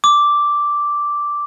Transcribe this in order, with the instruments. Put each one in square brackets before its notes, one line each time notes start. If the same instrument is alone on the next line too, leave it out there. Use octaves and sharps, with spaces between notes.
[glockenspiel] D6